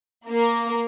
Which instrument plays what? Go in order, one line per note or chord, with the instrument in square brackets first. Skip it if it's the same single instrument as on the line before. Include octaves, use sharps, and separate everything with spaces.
[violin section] A#3